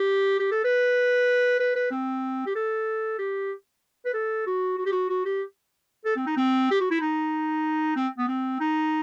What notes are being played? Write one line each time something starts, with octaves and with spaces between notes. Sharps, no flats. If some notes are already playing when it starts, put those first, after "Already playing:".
Already playing: G4
G4
A4
B4
B4
B4
C4
G4
A4
G4
B4
A4
F#4
F#4
G4
F#4
F#4
G4
A4
C4
D#4
C4
G4
F#4
E4
D#4
C4
B3
C4
D#4